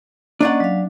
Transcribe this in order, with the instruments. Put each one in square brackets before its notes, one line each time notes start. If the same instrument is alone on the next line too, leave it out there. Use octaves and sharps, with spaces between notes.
[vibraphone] A#3 C#4 D#5 [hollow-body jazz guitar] D4 D5 F#5
[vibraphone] F#3 F5